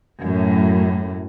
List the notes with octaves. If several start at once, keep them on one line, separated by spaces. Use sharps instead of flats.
F#2 A2